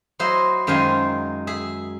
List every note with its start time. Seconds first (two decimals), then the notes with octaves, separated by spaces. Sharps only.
0.19 F#3 E4 C5 D#5 E5
0.67 F#2 D#3 G#3 C5 F5 G#5
1.47 G#4 E5